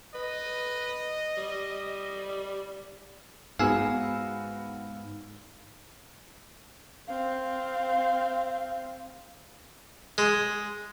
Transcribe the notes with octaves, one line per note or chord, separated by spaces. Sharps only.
B4 D#5
G3
G#2 G#3 B3 F#4 G#4 F5 E6
C4 F5
G#3